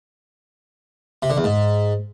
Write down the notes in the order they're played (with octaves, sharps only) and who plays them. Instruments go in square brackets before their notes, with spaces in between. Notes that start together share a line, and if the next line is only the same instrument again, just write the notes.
[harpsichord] C3
D3
E2
G#2